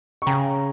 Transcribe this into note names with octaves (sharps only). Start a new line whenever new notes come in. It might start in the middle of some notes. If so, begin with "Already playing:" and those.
C#6
C#3 G5 A#5